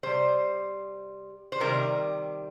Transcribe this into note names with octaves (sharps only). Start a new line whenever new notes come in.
C3 G3 C5
C5
C3 D#3 G3 A#4